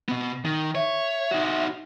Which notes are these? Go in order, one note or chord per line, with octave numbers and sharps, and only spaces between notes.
B2 B3
D#3
C#5 E5
D#4 F#4